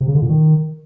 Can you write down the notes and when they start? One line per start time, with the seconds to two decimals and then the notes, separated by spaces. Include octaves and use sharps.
0.01 C3
0.08 C#3
0.15 D3
0.22 A#2
0.29 D#3